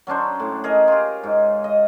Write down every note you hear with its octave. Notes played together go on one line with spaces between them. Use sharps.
F#3 C#4 D4 C5
A2
G#4 A#4 D#5
F4 G4
G#2
D#5